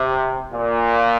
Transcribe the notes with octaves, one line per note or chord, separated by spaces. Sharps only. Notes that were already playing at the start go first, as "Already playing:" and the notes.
Already playing: C3
A#2